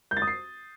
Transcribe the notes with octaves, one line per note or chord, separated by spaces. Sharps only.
G6
A6
D#6
C7